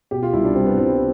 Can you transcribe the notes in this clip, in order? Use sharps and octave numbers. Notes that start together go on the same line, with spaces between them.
B2 G4
F4
C2 E4
D4
G3 C4
B3
C2 C4